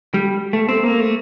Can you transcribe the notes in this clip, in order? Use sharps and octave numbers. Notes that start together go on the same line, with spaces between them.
G3
A3
C4
A#3
A3